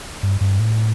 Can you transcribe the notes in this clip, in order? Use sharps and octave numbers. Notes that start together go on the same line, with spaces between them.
G2
G2
A2